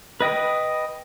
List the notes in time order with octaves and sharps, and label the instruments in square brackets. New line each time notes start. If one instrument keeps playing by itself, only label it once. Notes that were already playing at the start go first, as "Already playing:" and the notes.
[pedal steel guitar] B4 D#5 G5 D#6